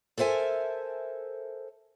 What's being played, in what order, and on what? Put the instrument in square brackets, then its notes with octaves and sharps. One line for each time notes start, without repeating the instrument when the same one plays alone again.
[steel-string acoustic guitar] A4 A#4 C5 E5 G#5 A5